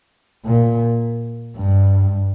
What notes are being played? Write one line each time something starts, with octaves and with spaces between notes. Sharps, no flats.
A#2
G2